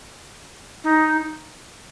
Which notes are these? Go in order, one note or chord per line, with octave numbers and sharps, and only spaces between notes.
D#4